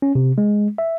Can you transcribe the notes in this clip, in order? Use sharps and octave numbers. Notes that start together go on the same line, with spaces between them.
C#4
C3
G#3
E5